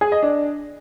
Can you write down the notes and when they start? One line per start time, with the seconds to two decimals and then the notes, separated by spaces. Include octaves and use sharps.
0.01 G#4
0.12 D#5
0.23 D4